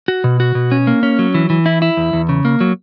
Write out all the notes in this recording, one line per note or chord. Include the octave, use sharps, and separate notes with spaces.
F#4
B2
F#4
B2
C#4
A#3
C#4
F#3
E3
E3
E4
E4
E2
E2
C#3
A#3
F#3